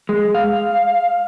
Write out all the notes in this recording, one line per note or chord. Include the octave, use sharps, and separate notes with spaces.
G#3
F5